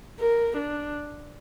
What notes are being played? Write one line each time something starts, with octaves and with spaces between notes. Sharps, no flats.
A#4
D4